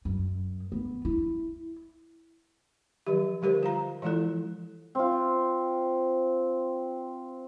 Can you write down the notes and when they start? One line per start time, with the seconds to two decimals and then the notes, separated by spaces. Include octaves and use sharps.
0.05 F#2
0.72 B3
1.05 E4
3.07 D#3 F3 F#3 G4
3.42 D3 G3 G4 A#4 C5 D#5
3.63 F4 F5 A#5
4.02 E3 F3 G#3 E4 F4 A4
4.95 C4 F4